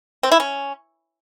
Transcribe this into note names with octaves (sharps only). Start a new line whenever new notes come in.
C4
E4
C#4